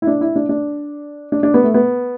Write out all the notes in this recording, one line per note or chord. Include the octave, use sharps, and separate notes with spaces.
E4
D4
E4
D4
D4
D4
D4
B3
A3
B3